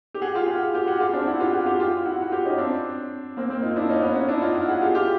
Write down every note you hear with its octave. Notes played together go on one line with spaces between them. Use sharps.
G4
F#4 G#4
F4 G4
F#4 G#4
F4 G4
F#4 G#4
F4 G4
C4 D4
E4 F#4
F4 G4
F#4 G#4
F4 G4
F4 G4
E4 F#4
F#4
F4 G4
C#4 D#4
C4 D4
A#3 C4
A#3 C4
D#4 F4
D4 E4
C#4 D#4
B3 C#4
C#4 D#4
D4 E4
D#4 F4
E4 F#4
F#4 G#4
F4 G4
F4 G4